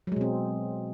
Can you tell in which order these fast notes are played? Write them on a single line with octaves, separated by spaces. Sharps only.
F#3 G#3 B2 C4